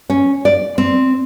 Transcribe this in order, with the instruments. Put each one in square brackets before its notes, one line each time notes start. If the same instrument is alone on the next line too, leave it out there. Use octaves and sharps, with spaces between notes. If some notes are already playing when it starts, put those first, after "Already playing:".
[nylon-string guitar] C#4
D5
C4